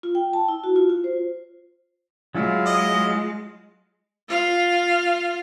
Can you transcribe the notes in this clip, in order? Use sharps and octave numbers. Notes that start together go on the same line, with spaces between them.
F4
G5
A5
E4
F#4
F4
F4
C5
F#3 G#3 E4 F4
D#5
F4 F5